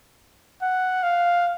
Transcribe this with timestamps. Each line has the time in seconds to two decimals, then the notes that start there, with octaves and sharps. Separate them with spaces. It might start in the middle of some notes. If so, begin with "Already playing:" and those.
0.62 F#5
1.03 F5